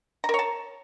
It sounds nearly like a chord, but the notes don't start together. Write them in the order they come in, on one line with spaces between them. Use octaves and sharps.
A#5 A#4 C#5 A5